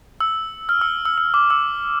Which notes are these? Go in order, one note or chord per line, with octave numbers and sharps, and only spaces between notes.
E6
F6
E6
E6
E6
D6
E6